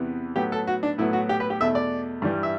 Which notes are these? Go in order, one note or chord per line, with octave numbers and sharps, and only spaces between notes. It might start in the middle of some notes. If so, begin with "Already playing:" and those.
Already playing: E2 C3 E3 B3
A2 F#3 B3 G4
A4
F#4
D4
A2 F#3 B3 E4
F#4
G4
B4
G4
E2 B2 A3 E5
D5
G2 E3 G3
E5